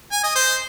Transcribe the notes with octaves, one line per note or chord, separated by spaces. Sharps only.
G#5
D#5
C5